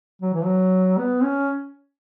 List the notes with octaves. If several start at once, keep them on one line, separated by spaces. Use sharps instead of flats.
F#3
E3
F#3
B3
C#4